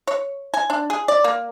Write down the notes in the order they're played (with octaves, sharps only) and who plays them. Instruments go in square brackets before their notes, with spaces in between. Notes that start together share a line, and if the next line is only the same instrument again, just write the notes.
[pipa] C#5
G#5
D4
G#4
D5
A#3